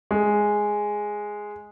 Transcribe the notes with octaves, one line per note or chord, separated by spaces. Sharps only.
G#3